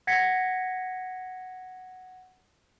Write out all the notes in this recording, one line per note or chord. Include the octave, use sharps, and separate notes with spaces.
F#5 G#6 A#6 B6 C#7